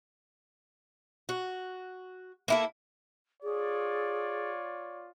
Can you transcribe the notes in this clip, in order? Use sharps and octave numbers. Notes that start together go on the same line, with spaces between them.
F#4
A#3 E4 A4
F4 G#4 C#5 D5